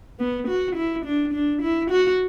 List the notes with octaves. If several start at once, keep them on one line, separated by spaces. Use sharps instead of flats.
B3
F#4
E4
D4
D4
E4
F#4